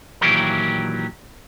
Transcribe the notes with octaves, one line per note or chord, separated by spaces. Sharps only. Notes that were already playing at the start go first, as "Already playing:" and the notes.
A#2 D#3 E3 F#3 G4 A#4